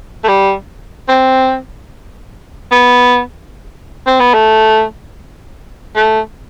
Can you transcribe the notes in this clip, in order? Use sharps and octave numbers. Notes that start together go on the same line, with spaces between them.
A3
G3
C4
B3
C4
B3
A3
A3